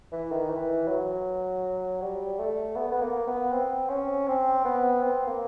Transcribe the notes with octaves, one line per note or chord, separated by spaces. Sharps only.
E3
D#3
E3
F#3
G3
A3
B3
B3
A#3
B3
C4
C#4
C4
B3
C4
A#3